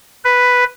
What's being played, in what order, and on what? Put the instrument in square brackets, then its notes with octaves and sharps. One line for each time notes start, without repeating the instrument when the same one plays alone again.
[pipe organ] B4